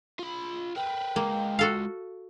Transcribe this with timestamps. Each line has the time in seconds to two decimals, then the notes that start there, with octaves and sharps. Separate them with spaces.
0.19 F4 B5
0.76 A#4 B4 G5
1.16 G#3 A#3 F4
1.59 F#4 A4 F5